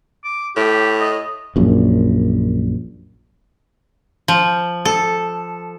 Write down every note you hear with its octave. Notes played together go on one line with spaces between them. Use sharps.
D6
A2 G4
D#5
A#1 F#2
F3
A4